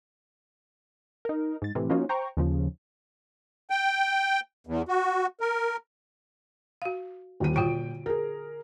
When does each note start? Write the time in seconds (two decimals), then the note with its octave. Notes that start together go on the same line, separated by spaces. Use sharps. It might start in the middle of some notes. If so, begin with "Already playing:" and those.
1.25 D#4 A#4
1.62 G#2 A6
1.75 A2 C3 E3
1.90 F3 A#3 C#4 D#4 F4 F#4
2.09 C5 G5 A#5 C#6
2.37 D#2 C#3 F3
3.70 G5
4.67 E2
4.88 F#4
5.41 A#4
6.82 F#4 F5
7.40 D#1 D#2 D#7
7.56 A#2 D3 F4 F#4 G5 D7
8.06 G#4 A#4